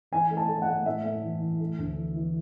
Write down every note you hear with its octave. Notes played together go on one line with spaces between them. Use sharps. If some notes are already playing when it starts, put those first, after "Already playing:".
E3 G#5
A3
A5
A3
F#5
A3
A2 E5
A2
E3
E3
A3
D2
E3
E3